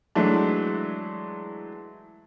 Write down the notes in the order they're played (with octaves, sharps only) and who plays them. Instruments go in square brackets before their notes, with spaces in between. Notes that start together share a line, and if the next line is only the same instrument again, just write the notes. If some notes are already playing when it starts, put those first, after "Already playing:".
[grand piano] E3 F#3 G#3 A3 D4